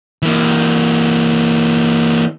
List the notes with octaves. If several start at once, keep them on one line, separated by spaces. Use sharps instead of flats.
E3 A#3